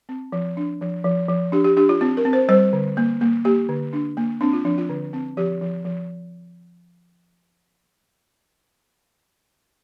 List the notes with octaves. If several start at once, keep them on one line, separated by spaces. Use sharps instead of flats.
C4
F3
D4
F3
F3
F3
D4 G4
G4
D4 G4
F4
C4 F4
A#4
C4
C5
G3 C5
D3
A#3
A#3
A#3 G4
D3
D4
A#3
C4 D4
F4
F3 D4
F4
D3
C4
F3 G4
F3
F3